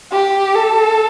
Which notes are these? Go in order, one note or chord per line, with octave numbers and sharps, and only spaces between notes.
G4
A4